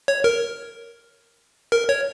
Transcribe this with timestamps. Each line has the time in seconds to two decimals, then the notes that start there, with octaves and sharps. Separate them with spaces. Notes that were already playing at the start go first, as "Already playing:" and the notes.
0.08 C#5
0.24 A#4
1.72 A#4
1.89 C#5